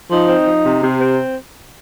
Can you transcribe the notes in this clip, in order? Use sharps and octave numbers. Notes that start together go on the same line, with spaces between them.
F3 D#4
C4
F3
C3
C3
C4